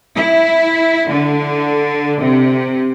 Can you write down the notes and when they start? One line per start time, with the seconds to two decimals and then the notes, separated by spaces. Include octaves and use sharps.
0.15 E4
1.09 D3
2.20 C3